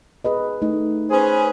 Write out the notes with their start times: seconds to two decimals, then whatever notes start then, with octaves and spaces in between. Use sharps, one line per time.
0.25 G#4 B4 D#5
0.62 A3 D#4
1.11 C#4 G#4 B4 C5